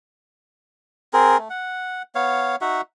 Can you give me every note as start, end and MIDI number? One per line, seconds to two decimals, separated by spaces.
1.13 1.38 60
1.13 1.38 68
1.13 1.38 70
1.38 1.48 57
1.50 2.02 78
2.15 2.56 59
2.15 2.56 73
2.15 2.56 77
2.61 2.81 63
2.61 2.81 66
2.61 2.81 76
2.61 2.81 78